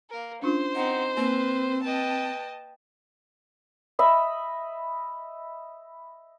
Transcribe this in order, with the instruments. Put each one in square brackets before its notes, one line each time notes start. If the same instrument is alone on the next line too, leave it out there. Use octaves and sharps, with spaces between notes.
[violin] A#3 A#4
[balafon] C#4 D4 F4 [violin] C5
[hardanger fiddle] C4 D#4 [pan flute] F#5
[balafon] A#3 [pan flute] C4 [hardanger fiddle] B4
[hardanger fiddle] B4 G5 [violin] D#5 A5
[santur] D#5 E5 B5